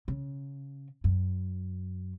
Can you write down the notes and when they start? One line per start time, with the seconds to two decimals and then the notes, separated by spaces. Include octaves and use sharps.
0.08 C#3
1.04 F#2